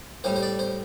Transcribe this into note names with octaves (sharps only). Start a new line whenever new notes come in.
A2 G3 C5
C5
D5
C5